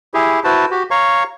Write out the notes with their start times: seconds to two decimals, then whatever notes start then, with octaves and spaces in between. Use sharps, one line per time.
0.14 E4 G4 G#4
0.44 E4 F#4 B4 C5 A5
0.71 F#4 G4
0.91 C#5 F5 A#5 C#6